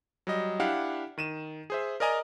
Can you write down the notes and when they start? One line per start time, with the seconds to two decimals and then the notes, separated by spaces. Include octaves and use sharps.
0.27 F#3 G3 D#5
0.60 D4 E4 G4 F5 F#5
1.18 D#3 D#7 E7
1.70 G#4 C5 E5
2.00 A#4 D5 D#5 G#5 A#5